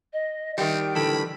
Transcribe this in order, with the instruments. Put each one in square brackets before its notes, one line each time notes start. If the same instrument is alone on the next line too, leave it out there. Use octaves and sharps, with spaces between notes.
[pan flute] D#5
[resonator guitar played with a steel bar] D#3 G3 [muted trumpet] C4 [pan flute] G5
[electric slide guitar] D3 E3 A4 [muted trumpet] B5